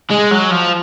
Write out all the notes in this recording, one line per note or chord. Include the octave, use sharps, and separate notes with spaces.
G#3
F#3
F3